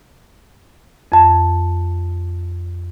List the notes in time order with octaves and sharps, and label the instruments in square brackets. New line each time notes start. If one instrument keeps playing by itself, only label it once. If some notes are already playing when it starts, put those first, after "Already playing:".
[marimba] F2 A5